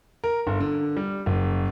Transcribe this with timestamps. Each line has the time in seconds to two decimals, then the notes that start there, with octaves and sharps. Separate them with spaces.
0.24 A#4
0.47 G1
0.60 D3
0.97 G3
1.26 F#1